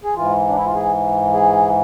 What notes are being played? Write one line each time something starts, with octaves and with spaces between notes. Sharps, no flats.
G#4
G#2 E3 F4
D4
E4
F4
G#4
G#4